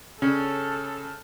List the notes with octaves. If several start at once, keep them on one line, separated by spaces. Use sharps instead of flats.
C#3 C#4 A4